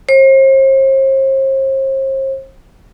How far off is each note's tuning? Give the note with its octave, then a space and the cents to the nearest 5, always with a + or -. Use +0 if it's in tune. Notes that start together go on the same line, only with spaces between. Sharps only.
C5 +40